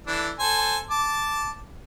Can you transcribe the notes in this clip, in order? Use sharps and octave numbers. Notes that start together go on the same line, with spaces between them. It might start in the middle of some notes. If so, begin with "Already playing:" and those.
E3 D4 A4
A4 C5 G#5
A5 D6